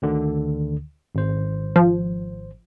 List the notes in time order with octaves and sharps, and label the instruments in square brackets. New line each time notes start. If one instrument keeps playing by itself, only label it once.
[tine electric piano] D2 D3 D#3
G#1 C5
[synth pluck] F3